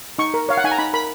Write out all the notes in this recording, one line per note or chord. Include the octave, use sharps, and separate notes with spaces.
D#4 C#6
A#4
C#5 F5
F#5
D#4 G#5
A#5
D#4 B5
A#4 B5